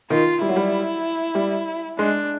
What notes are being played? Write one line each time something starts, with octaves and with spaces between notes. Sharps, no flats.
D#3 F4
G3 E4
F#3
G3
G3
G#3 D4